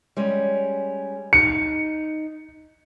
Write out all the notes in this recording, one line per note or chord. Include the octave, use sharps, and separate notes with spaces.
G3 G#3 C#4
D#4 C#7